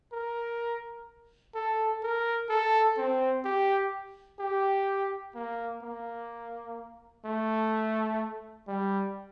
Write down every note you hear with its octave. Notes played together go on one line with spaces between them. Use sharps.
A#4
A4
A#4
A4
C4
G4
G4
A#3
A#3
A3
G3